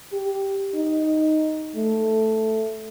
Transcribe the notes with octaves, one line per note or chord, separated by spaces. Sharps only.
G4
D#4
A3